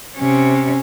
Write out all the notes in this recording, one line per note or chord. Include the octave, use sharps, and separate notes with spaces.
C3 C#4